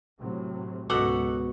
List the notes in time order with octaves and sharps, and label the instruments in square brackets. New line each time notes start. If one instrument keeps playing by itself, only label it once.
[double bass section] A2 C3 F#3
[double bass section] C#2 G#2 [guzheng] B2 [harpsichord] F#4 A4 F#5 [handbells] D6